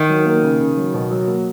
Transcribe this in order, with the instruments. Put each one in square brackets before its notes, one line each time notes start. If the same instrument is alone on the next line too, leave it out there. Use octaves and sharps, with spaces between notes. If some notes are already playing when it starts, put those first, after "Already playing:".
Already playing: [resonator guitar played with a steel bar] D#3
[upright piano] F#3
A#3
C#3
C#3
F#3
B2
F#3
A#3